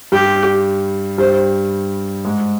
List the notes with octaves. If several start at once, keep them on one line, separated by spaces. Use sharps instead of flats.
G2 G3 G4
G2 G3 C5
G#2 G#3